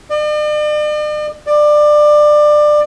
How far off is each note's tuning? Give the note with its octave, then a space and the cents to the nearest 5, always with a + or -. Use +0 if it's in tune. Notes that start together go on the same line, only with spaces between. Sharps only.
D5 +45
D5 +20